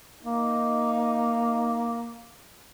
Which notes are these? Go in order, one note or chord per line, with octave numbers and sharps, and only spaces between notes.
A#3 D#4